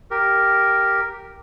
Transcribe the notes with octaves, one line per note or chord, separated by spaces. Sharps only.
G4 A#4